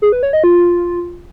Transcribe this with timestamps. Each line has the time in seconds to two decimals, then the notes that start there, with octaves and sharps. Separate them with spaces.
0.02 G#4
0.12 B4
0.23 C#5
0.33 D#5
0.44 F4